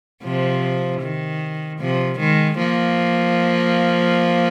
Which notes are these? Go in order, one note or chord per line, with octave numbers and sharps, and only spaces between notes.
C3 F3
D#3
C3 F3
D#3 G#3
F3 A#3